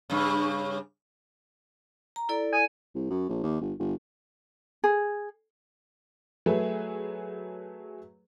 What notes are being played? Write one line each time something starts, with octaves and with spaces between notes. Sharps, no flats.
G2 C#3
A#5
E4 A4 D5
G#5
C2
F#2
A#1
D#2
G1
G1
G#4
F#3 A3 G#4 B4